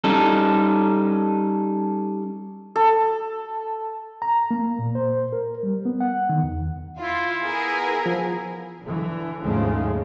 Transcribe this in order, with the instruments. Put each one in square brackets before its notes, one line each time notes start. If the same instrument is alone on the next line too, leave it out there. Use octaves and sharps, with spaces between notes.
[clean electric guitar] G3 C#4 D#4 A4
[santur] A4
[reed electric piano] A#5
A#3
A#2
C5
A#4
G3
B3
F#5
D#3
E2
[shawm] E4 [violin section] F4
[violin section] B3 G#4 A#4
[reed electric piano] F3
[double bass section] D3 E3
D#2 G#2 C#3 F3 G#3 A3